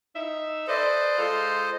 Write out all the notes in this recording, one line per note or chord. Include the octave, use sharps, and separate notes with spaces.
D#4 E5
A4 B4 C5 D5 D#5
G#3 F4 A4